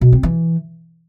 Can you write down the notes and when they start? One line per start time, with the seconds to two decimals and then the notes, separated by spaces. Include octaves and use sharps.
0.01 B2
0.12 C4
0.23 E3